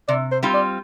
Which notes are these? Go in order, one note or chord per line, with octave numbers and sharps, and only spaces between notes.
C3 D5
C5
G3 C4 F4
D5